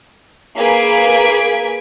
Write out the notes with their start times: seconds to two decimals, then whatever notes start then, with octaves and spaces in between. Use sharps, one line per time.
0.57 A#3 G#4 B4 G#6 B6 D7